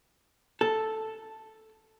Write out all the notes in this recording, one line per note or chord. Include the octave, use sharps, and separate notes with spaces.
A4